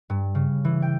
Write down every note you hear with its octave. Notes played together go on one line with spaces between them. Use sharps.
G2
C#3
E3
G5